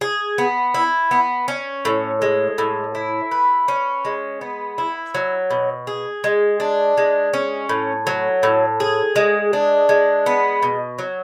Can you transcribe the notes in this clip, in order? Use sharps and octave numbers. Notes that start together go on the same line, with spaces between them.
G#4
B3
E4
B3
C#4
A2
G#3
A2
E4
B4
C#4
G#3
B3
E4
F#3
B2
G#4
G#3
D4
G#3
C#4
A2
F#3
A2
G#4
G#3
D4
G#3
B3
B2
F#3